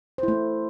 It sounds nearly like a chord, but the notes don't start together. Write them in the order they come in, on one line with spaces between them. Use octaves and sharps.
C5 E4 A3